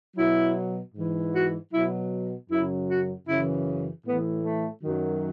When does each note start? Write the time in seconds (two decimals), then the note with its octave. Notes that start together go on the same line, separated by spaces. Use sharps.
0.16 B2 F#3 E4
0.94 G#2 E3
1.33 F#4
1.71 B2 F#3 E4
2.49 F#2 C#3 F#3 E4
2.88 F#4
3.26 F#2 C#3 E3 E4
4.05 A2 E3 B3
4.43 A3
4.82 F#2 D#3 F#3